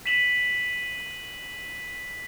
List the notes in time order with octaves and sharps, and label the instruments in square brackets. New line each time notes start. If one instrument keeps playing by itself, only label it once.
[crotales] B6 D#7 E7 F#7